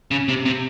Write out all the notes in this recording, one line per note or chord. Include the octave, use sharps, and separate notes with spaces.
C#3
C3
C3